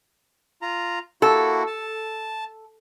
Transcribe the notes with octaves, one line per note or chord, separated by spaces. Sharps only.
F4 A#5
A#3 E4 F#4 A4
A5